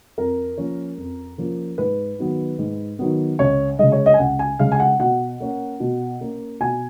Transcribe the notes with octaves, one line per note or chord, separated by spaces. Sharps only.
F2 A#4
F3 A#3 C#4
F2
F3 A#3 C#4
G#2 B4
D#3 F#3 B3
G#2
D#3 F#3 B3
C#2 C#5
C#3 G#3 D#5
C#5
D#5
G#5
C#2 F#5
G#5
C#3 G#3 F5
G#5
F#5
B2 F#5
A#3 C#4
B2
A#3 C#4
B2 G#5